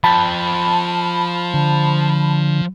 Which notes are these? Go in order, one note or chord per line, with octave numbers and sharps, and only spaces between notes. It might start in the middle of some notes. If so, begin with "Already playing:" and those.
F3 G5 A5 B5
D3